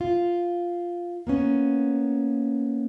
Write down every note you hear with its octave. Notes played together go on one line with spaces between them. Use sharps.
F4
A#3 B3 C#4